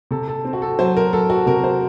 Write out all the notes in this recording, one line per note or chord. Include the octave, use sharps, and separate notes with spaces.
C3 A4
A4
C4
F#4
A4
F#3 C5
A#4
F#3 A4
F#4
C3 A#4
C5